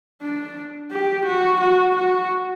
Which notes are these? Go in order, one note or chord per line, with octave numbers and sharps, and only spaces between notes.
D4
G4
F#4
F#4
F#4